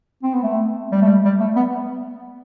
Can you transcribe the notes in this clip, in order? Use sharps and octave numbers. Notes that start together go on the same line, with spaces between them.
C4
B3
A3
G3
A3
G3
G3
A3
B3